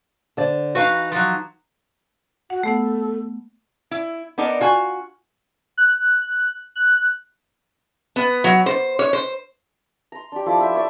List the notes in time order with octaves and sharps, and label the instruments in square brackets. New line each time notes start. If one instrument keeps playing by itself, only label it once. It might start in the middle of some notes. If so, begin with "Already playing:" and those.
[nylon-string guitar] D3 C5 D5
[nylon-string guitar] E3 D#4 [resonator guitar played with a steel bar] F#4 B4 F5
[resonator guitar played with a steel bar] F3 F#3
[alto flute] F#4 [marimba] F#5
[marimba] A3 B3 F#5 [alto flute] A4
[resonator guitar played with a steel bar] E4
B3 D4 D#4 A#4
F4 F#4 G#5
[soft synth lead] F#6
F#6
[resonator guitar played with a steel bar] B3
F#3
C5
C#5
C5
[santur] A#5 C6
D4 G4
F3 E4 A4 D6
E4 G4 E5
C#5 D5 E5